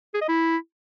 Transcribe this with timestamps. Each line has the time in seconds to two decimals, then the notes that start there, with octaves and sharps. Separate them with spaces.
0.14 G#4
0.21 D#5
0.28 E4